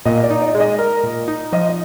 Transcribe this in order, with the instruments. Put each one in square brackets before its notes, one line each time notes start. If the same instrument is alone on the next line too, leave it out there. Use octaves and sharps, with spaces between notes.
[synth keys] A#2 [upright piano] D#5
[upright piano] D5
[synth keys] D#4
[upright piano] D5
[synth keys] G#3 [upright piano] D5
[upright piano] D#5
[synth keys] A#4
A#2
D#4
[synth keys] F3 [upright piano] D#5
[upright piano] D#5